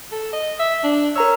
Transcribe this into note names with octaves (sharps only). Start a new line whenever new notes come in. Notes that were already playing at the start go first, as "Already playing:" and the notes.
A4
D#5
E5
D4
A#4 C#5 A#5 E6